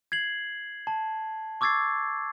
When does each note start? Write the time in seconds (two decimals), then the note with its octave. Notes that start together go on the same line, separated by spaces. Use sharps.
0.12 G#6 C7 F#7
0.87 A5
1.61 C#6 D6 E6 G#6 A6 C7